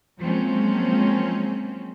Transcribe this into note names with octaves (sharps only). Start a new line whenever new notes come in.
F3 F#3 G#3 A#3 C4 C#4